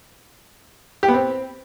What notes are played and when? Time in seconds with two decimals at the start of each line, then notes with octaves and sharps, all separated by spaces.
1.03 G4
1.08 B3
1.14 C4